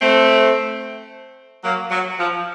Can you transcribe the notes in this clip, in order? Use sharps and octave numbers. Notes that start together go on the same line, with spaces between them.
A3 C4
F#3 A#3
F#3
F3